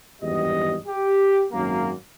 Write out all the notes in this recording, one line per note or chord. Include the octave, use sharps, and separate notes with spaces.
G#1 E2 G2 G4 D#5
G4
G#1 F#2 A#3